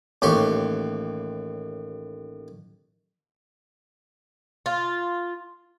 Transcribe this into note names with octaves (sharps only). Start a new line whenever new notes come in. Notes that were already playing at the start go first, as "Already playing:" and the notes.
A1 D#2 G4 C6 C#6
F4